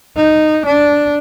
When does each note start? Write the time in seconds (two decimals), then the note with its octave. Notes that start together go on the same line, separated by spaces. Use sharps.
0.16 D#4
0.66 D4